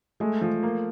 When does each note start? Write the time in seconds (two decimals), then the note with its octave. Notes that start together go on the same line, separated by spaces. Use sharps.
0.20 G#3 A3
0.41 F3
0.63 A#3